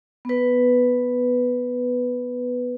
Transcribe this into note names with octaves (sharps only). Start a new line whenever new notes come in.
B3 B4